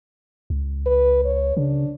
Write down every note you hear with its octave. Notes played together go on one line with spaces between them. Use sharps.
C#2
B4
C#5
C#3 D4